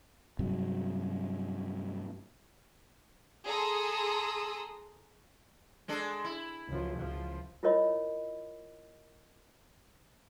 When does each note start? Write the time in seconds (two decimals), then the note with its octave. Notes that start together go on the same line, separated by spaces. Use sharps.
0.39 G2 C3 F#3
3.46 G#4 A4 A#5 C6 D#6 E6
5.88 G#3 D4 A4
6.25 E4
6.68 C#2 F#2 F3
6.97 C#2 F3
7.63 E4 F4 A#4 C#5 D#5 B5